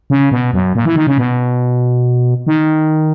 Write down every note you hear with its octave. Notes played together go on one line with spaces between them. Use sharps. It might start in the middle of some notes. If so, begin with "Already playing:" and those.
C#3
B2
F#2
A#2
E3
D#3
C#3
B2
D#3